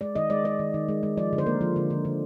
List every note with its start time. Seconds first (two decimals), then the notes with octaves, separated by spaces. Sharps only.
0.01 G#3 D5
0.16 D#3 D#5
0.30 G#3 D5
0.45 G#3 D5
0.59 D#3
0.74 D#3
0.88 G#3
1.03 G#3
1.17 F3 D5
1.33 D3
1.38 C5
1.46 A#3 A#4
1.61 F3
1.76 D3
1.90 D3
2.05 D3